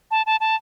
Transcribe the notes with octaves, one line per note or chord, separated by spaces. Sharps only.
A5
A5
A5